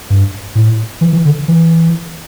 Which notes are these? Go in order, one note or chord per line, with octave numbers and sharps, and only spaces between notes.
G2
A2
E3
E3
D3
E3